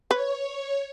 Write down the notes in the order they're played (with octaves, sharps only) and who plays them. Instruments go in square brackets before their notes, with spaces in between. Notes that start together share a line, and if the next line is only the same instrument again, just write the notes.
[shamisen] B4 [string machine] C#5